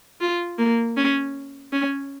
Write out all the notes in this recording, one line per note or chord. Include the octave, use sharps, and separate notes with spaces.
F4
A#3
C#4
C#4